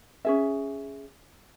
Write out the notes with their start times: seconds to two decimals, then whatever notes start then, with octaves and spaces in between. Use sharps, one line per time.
0.25 C#4 G#4 E5